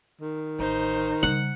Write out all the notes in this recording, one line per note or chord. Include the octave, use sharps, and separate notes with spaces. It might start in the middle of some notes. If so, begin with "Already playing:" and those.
D#3
A1 D#4 C5
C#3 G3 F#5